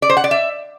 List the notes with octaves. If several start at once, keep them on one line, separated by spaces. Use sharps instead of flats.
D5
C5
F#5
D5
E5